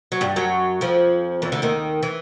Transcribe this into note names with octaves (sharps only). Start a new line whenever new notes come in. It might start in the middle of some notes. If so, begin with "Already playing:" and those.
F#3
G2 G3
F#2 F#3
F2 F3
E2 E3
D2 D3
D#2 D#3
E3